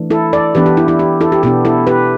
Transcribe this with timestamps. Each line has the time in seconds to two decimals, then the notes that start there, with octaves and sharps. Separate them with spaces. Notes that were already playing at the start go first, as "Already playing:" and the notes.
Already playing: E3 A3 D4
0.10 E4 A4
0.33 A4 D5
0.55 E3 B3 D4 G4 B4
0.66 G4
0.77 E4
0.88 E4
0.99 G4
1.21 E4 A4
1.32 G4
1.43 B2 B3 D4 G4
1.65 E4 A4
1.87 G4 B4